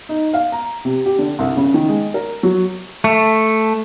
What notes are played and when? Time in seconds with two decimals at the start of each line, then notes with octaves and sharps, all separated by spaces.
0.09 D#4
0.34 F5
0.52 A#5
0.85 C3
1.06 G4
1.19 D3
1.39 C2
1.57 C#3
1.74 D#3
1.89 G#3
2.14 A#4
2.43 F#3
3.04 A3